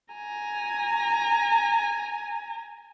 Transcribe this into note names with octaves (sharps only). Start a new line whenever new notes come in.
G#5 A#5